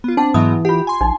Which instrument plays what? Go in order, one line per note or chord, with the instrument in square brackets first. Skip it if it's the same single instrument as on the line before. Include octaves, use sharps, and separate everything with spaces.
[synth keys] B3 F4
[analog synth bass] C4 [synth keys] D4 [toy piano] F#5 A5
[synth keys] G#2 F#3 B3 [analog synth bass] E3 [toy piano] D#6
[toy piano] F4 F#5 [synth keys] G4
[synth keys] G#5 C6
[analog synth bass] A#1 [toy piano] D4 D#4